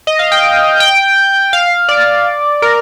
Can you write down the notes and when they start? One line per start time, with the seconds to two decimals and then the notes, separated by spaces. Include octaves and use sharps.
0.07 D#5
0.19 F5
0.32 G5
0.80 G5
1.53 F5
1.89 D5
2.62 A#4